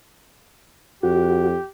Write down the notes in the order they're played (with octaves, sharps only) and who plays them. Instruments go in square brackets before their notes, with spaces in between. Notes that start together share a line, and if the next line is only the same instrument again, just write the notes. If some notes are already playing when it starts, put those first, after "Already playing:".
[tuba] F2 [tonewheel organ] F#4 [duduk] G4